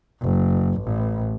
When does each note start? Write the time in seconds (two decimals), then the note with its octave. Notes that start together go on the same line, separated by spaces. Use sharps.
0.21 F#1
0.81 A1